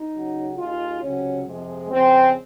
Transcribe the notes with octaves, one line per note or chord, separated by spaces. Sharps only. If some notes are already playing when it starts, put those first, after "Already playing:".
Already playing: D#4
C#2 C#3 F#3
D#2 D#3 G#3 F4
C#2 C3 F#3 C#4
F2 C3 F3 G#3
F2 C#3 G#3 C4